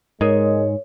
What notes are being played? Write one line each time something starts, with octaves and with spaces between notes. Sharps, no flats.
G#2 G#3 A#4 C#5 D#5